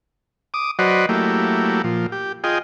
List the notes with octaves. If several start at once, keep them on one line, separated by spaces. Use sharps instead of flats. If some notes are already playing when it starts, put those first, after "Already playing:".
D6 D#6
F#3 F#4 B4 C5 D5 D#5
F#3 A3 A#3 E4 G4
A#2 F3
G4
F4 G#4 D#5 G5